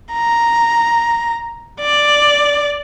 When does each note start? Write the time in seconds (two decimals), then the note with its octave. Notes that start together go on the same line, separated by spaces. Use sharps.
0.13 A#5
1.81 D5